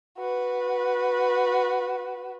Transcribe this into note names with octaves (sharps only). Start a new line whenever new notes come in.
F#4 B4